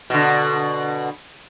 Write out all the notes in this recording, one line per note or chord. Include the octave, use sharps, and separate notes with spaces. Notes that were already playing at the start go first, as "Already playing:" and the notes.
B2 D3